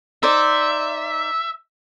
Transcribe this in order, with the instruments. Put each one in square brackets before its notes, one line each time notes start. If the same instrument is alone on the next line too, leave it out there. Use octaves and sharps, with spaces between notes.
[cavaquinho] D#4 C5 D5 [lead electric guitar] E5